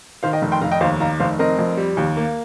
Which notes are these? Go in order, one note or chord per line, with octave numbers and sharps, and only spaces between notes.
D#3 C5 F5
D#5 G5
F1
G5 C6
F1 F5 A#5
D#5 G5
D#2 C5 F5
D#3 F5 A#5
F1 C5 F5
C4 A#4 D#5
F2
G3
D#2
A#3